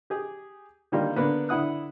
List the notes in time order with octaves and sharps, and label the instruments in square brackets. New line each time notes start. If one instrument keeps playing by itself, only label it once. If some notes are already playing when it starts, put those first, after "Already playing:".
[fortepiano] G4 G#4
D3 D#3 G3 A#3 F4
D3 A#3 B3
D3 E4 F#5 D#6 F#6